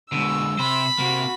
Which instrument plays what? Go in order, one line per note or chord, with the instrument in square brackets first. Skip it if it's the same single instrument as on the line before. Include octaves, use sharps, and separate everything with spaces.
[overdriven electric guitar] B2 [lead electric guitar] D3 G#3 [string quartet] E6
[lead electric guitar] C3 [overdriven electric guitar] C5 [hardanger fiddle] B5
[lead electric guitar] C3 [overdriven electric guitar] A#3 [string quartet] F#4